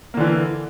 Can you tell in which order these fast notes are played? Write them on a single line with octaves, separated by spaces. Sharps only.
A#3 D3 E3